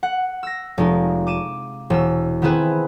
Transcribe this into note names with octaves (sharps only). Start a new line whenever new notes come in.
F#5
E6 A#6
F1 G#3 D#4
D6 D#7 E7
E1 E6
D#3 B3 C4 E4 G#4 B4